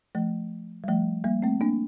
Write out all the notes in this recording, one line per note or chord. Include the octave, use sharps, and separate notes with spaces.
F3 A3
G3
F3 A3
G3 A#3
A3 C4
A#3 D4